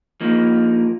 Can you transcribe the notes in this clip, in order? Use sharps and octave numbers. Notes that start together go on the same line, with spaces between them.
F3 A#3 D#4